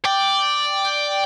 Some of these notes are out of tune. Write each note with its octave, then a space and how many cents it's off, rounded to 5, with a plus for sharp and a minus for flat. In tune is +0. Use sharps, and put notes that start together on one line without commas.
D5 +0 G5 +0